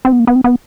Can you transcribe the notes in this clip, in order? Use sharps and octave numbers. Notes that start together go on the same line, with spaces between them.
C4
B3
A#3
B3
C4
B3